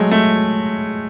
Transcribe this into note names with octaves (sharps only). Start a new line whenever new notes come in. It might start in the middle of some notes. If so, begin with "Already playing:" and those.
Already playing: F#3 G#3 A3
A3